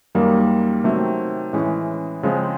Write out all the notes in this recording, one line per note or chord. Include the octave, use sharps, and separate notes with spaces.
F#2 D#3 G3 A#3
C3 D#3 F#3 A3 C4
A2 E3 G#3 C#4
C#3 F3 G#3 C4